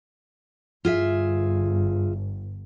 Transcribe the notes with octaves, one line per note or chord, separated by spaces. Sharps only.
G1 F4 G#4 E5